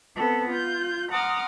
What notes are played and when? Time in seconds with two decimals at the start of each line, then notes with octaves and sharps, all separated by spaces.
0.15 B3 C4 A4
0.47 F4 G6
1.10 F#5 A#5 C6 D6 D#6 F6